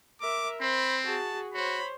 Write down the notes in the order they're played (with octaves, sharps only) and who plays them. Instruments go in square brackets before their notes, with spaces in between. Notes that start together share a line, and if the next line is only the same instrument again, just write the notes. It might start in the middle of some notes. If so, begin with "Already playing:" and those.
[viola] A#4 E5 [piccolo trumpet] D6
[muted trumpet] C4 [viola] C5 [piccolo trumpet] B5
[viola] F#4 G#4 [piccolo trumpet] A5
[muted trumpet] F#4 [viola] C5 C#5 [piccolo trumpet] B5